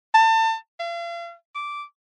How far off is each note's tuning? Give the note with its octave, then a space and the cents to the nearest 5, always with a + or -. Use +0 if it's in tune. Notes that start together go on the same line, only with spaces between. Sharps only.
A5 +30
F5 -40
D6 -5